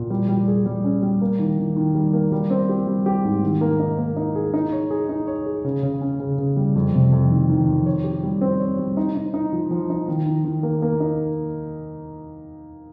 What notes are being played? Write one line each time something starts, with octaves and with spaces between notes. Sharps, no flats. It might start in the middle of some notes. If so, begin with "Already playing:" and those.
Already playing: A#2
G3
G3
G#4
G3
C#4
G3
A#3
D#3
D#3
D#3
G3
A#3
G3
C4
G4
G3
G4
G#2
D#3
A#3
D#4
A#3
D#4
G#4
D#4
C#5
G#4
D#4
C#5
G#4
C#3
C#3
C#4
C#3
C#3
G3
F2
C3
F2
D#3
D#3
F2
C#5
G4
G3
C4
C#5
G3
D#4
D#4
D#4
F3
F3
D#4
D#3
D#3
D#3
A#3
A#3
D#4